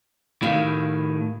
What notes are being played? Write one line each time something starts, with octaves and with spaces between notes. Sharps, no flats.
A2 D#3 E4 G4 F5